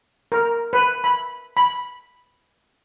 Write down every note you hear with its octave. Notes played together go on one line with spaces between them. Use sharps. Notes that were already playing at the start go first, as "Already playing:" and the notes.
A#4
B4
B5
B5